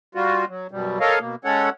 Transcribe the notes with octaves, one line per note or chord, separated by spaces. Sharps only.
G3 F4 F#4
F#3
F#2 B2 G3
A4 A#4 C#5 D#5 F5
B2 A#3
G#3 C#4 A4 C#5 F#5